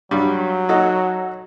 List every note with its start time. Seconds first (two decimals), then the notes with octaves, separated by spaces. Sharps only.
0.11 G2 F#3 G3
0.69 D#4 F#4 A4